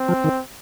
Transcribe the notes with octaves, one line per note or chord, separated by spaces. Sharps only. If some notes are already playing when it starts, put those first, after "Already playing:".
Already playing: C4
F3
D#3